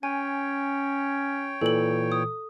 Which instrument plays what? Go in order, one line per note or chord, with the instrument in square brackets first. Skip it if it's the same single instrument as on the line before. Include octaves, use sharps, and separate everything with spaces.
[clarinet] C#4 [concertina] C#5 G5 [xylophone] G#5
[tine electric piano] A#2 E3 [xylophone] A4 F#7
[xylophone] D#6